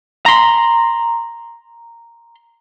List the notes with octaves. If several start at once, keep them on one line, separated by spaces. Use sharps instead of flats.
A#5 C6